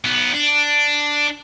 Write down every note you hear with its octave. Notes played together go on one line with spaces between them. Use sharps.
B1 B3
D4